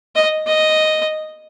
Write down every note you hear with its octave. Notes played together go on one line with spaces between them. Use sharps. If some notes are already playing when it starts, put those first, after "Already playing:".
D#5
D#5